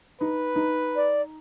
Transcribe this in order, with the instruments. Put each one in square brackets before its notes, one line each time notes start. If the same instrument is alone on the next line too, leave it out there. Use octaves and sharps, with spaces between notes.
[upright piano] D#4 [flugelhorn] B4
[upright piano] D#4
[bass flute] D5